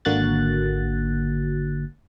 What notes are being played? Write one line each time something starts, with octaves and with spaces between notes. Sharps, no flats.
G#1 D3 A#3 F#4 F#6 A6